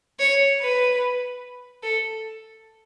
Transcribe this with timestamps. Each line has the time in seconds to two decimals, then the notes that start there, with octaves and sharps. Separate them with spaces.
0.19 C#5
0.60 B4
1.83 A4